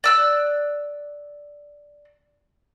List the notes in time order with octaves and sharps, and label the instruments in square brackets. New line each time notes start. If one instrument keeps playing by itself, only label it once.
[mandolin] D5 E6 F#6